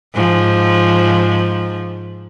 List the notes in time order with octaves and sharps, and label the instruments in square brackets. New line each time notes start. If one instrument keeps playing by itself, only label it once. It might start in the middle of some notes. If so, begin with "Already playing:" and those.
[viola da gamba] G#2 F3